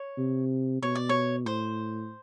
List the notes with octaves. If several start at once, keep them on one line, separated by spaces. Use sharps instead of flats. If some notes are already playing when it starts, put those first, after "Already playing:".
Already playing: C#5
C3
B2 C#5
D5
C#5
A2 C5